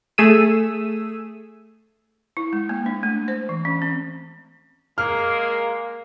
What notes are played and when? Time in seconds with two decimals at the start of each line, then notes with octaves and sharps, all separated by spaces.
0.18 A3 G#4 E6 D#7
2.37 E4
2.53 G#3
2.69 A#3
2.86 D4
3.03 A3
3.28 C5
3.49 E3
3.65 C#4
3.82 C4
4.98 G#3 A#3 F6